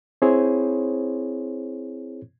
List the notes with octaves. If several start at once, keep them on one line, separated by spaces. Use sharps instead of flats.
C4 E4 G#4 C5 C#5